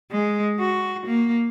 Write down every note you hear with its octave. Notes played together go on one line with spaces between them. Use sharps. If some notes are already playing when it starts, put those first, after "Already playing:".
G#3
F#4
A#3